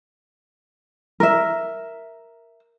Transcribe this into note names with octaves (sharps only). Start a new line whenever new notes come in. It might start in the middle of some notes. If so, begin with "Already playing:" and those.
A#4 E5